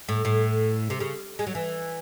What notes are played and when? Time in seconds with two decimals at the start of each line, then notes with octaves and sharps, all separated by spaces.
0.09 A2
0.25 A2
0.90 C3
1.00 C#3
1.39 G#3
1.47 F#3
1.55 E3